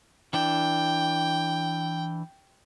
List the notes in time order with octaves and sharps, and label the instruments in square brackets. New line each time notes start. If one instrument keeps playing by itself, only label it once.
[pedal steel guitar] E3 D4 [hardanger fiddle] G5